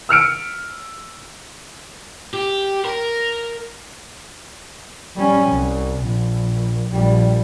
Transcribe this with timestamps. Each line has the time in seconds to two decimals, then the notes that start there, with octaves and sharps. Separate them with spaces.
0.09 E6 F6 C#7 D7
2.34 G4
2.85 A#4
5.16 G3 C#4
5.48 C2
6.03 A#1
6.90 A#1 G3